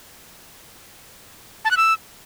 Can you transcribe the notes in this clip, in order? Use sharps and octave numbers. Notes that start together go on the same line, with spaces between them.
A5
F#6
E6